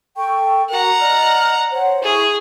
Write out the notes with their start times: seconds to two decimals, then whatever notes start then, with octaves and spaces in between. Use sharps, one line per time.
0.16 A4 G5 C#6
0.70 F#4 A#4 F#5 A#5
1.00 D5 D#5 F6
1.72 C5 C#5 F#5
2.03 E4 G#4 C#6